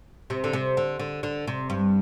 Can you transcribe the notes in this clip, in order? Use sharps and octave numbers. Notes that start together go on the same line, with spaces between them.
C3
D3
C3
D3
D3
D3
C3
G2